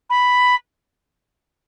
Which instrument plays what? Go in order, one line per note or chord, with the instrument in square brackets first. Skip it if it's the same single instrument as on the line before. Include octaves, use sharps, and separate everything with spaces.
[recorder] B5